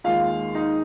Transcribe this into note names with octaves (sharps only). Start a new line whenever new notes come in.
D#2 D#3 G#3 F4 F5
D#4 D#5